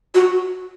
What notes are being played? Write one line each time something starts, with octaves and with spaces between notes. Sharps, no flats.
F#4